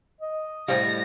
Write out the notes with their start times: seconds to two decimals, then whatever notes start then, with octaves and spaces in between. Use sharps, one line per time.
0.21 D#5
0.68 A2 G3 C5 F5 A#6